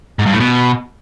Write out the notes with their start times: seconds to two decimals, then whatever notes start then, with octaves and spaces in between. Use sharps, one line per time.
0.19 G#2
0.26 G2
0.33 A2
0.40 B2